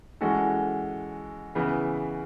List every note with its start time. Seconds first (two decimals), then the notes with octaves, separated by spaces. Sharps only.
0.21 E3 G#3 C#4 F#4 A4
1.55 C#3 E3 B3 E4